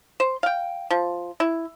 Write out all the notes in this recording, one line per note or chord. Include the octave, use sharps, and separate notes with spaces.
C5
F5 G5
F3
E4